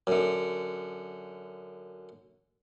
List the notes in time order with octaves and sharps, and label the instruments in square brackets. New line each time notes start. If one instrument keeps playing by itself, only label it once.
[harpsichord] F#2 D3